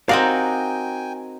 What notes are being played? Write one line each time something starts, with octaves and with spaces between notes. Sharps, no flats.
C4 D#4 F#4 A#4 D5 F5 G5 G#5